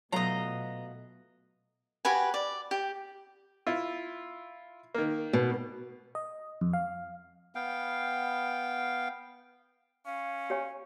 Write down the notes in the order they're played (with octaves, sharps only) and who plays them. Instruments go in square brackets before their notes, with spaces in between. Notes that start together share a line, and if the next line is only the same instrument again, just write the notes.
[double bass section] B2 [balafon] F#3 [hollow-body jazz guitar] A3 B3 F4 [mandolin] D#5 A#5
[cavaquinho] F#4 G4 B4 G#5
D5
G4
[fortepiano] E4 F4
D#3 A#3
[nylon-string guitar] B2
[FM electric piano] D#5
F2
F5
[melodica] B3 F5 G5
[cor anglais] C#4 [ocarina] F5
[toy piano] G4 C#5 G#5